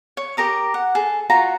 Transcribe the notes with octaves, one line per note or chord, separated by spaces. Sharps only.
C#5
G4 A#4 A#5 D#6
F#5
G#4 A4
F4 F#4 C#5 A#5